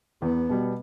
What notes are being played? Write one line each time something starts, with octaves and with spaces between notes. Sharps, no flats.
E2 B3
B2 G3